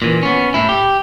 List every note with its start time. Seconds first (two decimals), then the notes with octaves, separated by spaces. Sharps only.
0.02 A#2 E3
0.23 B3 C#4
0.54 A2 E4
0.69 G4